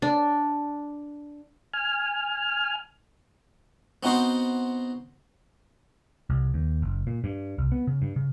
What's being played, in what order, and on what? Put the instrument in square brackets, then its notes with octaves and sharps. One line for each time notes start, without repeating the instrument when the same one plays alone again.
[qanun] D4
[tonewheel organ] G#5 F6
[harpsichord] B3 C4 D#4 F#4 C5
[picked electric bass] C2
D#2
F#1
A#2
G2
C2
B3
C#3
G2
C#3